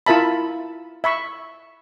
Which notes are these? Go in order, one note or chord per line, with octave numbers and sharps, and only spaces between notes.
E4 F4 A#4 E5 A5 B5
E5 B5 C#6